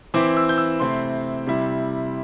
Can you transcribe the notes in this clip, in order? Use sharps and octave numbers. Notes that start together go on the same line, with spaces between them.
E3 C4 E4 D6
E6
G6
E6
C3 A3 C4 E4 C6
C3 G3 E4